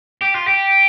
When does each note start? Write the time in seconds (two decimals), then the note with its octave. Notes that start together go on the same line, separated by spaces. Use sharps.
0.21 G4
0.35 F4
0.47 G4